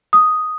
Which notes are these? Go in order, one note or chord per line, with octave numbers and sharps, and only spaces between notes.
D#6